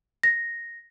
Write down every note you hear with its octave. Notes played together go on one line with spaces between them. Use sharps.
A#6